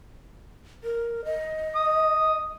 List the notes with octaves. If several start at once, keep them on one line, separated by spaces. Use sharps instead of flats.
A#4
D#5
D#6